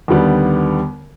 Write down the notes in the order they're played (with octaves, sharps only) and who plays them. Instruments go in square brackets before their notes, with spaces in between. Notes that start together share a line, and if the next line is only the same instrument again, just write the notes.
[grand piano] D#2 D3 G3 B3